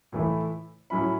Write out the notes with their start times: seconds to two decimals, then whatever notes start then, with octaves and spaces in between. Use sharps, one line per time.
0.12 A2 E3 A3 E4
0.90 A2 F#3 C#4 E4 B5